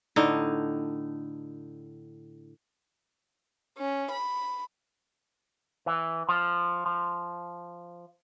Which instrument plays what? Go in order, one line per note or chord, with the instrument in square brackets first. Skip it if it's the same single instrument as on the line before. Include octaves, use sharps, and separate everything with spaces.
[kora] A2 D3 D#4
[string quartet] C#4
B5
[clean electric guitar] E3
F3
F3